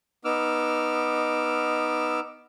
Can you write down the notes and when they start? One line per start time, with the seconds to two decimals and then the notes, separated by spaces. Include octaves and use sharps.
0.25 B3 D#4 D6 E6 F6